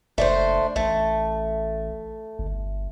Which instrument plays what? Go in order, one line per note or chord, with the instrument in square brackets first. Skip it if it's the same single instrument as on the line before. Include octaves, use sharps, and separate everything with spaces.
[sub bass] F#1 [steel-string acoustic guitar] A3 D4 C5
[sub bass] A1 [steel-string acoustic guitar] A3
[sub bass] G1